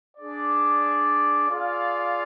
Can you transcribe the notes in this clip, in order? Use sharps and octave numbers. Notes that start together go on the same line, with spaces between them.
D4 G#4 D5
F4 G#4 D5 F5